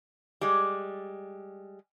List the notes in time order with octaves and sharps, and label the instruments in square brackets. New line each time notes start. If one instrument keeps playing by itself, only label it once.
[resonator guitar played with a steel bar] G3 G#3